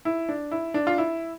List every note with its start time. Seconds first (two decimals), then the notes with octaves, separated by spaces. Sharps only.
0.05 E4
0.29 D4
0.51 E4
0.74 D4
0.87 F4
0.98 E4